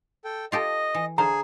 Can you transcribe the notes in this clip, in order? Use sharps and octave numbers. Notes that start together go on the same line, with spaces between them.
A4 G5
F4 G4 A4 D#5
E3
D3 G#4 C5 F5 A#5